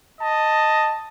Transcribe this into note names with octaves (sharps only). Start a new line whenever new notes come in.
D#5 A5